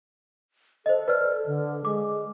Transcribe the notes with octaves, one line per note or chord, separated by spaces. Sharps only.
A4 C5 D#5
B4 D5 F6
D3
G#3 D6